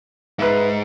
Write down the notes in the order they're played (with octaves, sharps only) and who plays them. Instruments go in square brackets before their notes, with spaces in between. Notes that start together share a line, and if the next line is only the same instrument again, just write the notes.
[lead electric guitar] G#2 [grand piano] B4 E5